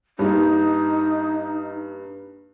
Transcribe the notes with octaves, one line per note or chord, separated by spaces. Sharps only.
G2 G3 A#3 D#4